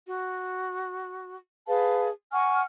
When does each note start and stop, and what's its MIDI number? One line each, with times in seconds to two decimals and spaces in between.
0.06 1.36 66
1.67 2.09 68
1.67 2.09 71
1.67 2.09 77
1.67 2.09 81
2.32 2.62 78
2.32 2.62 80
2.32 2.62 85
2.32 2.62 89